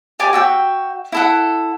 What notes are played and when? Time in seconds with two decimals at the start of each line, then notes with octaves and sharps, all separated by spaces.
0.19 G4 D5 G#5 D6
0.33 F#4 E5 G5
1.12 E4 A4 F#5